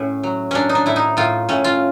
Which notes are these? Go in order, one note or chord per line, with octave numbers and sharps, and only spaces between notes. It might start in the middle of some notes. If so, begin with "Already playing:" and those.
Already playing: A2 C#4
F#3
F#3 C#4 D4
D#4
D4
A2 E4
D#4
A2 F4
A2 C#4
F4